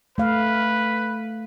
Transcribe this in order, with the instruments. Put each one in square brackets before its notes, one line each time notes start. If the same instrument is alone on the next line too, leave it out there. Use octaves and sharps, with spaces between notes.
[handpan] A3 F5 [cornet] B4